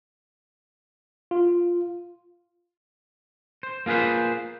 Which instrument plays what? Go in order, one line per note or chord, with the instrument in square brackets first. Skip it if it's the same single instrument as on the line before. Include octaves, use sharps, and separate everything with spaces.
[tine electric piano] F4
[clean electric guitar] C5
A#3 F4 G#4 B4 C5